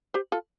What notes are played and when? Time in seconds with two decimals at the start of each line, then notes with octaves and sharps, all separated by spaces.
0.14 G4 C5
0.32 F4 A4